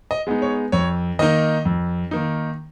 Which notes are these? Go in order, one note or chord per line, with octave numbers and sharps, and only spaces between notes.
D#5
G#3 B3 D#4
C#5
F2 C#5
D#3 A#3 D#4 D#5
F2
D#3 A#3 D#4